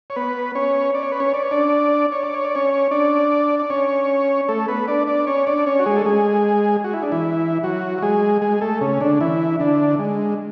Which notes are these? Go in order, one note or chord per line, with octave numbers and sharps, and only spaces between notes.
C#5
B3 B4
C#4 C#5
D5
C#5
B4
C#4 C#5
D5
C#5
D4 D5
C#5
D5
C#5
D5
C#4 C#5
D4 D5
D5
C#4 C#5
A3 A4
B3 B4
D4 D5
D4 D5
C#4 C#5
D4 D5
C#4 C#5
F#4
G#3 G#4
A4
G#3 G#4
F#4
E4
D4
E3 E4
F#3 F#4
F#4
G#3 G#4
G#3 G#4
A3 A4
C#3 C#4
D3 D4
E3 E4
D3 D4
G#3